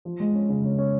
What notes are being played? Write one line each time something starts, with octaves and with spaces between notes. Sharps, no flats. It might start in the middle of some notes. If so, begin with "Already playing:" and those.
F3
G#3
C#4
C#3
C#4
C#4